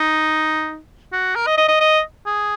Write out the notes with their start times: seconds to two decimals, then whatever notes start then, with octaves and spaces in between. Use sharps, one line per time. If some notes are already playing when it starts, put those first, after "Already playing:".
Already playing: D#4
1.12 F#4
1.35 A#4
1.46 D#5
1.57 D#5
1.68 D#5
1.80 D#5
2.26 G#4